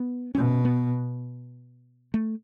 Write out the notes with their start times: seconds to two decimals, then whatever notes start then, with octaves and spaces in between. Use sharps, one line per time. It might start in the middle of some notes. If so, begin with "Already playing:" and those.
Already playing: B3
0.35 B2 C#4
0.65 B3
2.14 A3